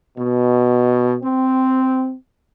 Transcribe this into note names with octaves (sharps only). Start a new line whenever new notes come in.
B2
C4